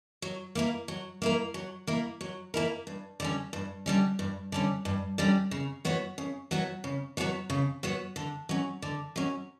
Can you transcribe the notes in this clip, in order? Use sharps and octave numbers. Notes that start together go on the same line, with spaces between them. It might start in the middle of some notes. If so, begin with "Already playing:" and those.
F#3
A#3 E4 A#4
F#3
A#3 E4 A#4
F#3
A#3 E4 A#4
F#3
A#3 E4 A#4
G2
D3 G3 C#4
G2
D3 G3 C#4
G2
D3 G3 C#4
G2
D3 G3 C#4
C#3
F#3 B3 F#4 C#5
C#3
F#3 B3 F#4 C#5
C#3
F#3 B3 F#4 C#5
C#3
F#3 B3 F#4 C#5
D3
F#3 C#4
D3
F#3 C#4